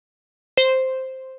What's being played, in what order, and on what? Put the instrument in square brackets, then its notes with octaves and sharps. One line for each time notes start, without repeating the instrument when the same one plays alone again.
[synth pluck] C5